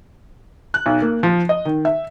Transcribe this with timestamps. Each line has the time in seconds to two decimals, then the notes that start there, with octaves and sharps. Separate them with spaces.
0.74 F#6
0.86 B1
1.02 A#3
1.23 F3
1.49 D#5
1.65 D#3
1.85 E5